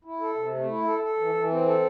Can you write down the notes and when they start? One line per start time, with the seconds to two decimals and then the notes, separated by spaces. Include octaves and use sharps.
0.05 E4
0.21 A4
0.36 C3
0.54 A3
0.69 E4
0.85 A4
1.02 A4
1.19 E3
1.35 E3
1.51 C4
1.66 A4